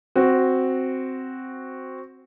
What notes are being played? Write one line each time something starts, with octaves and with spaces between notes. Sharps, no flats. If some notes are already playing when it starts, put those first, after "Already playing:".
C4 F#4